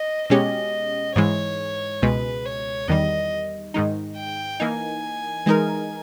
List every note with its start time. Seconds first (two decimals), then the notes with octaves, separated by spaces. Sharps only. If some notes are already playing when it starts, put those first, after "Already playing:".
Already playing: D#5
0.30 B2 G#3 C#4 G4 D#5
1.16 G#2 E3 G#3 C#5
2.02 C#2 B2 G#3 B4
2.45 C#5
2.88 E2 D#3 G3 D#5
3.74 G#2 D#3 G#3 D#4
4.17 G5
4.60 E3 A#3 D#4 G#5
5.46 E3 G#3 D#4 A#4